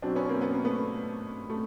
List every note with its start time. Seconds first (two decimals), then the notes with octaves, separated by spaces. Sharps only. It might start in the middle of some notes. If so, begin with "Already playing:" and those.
0.02 B2 F#3 C4 D4
0.15 B3 C#4
0.28 A#3 C4
0.41 B3
0.53 A#3
0.64 A3 B3
1.50 A3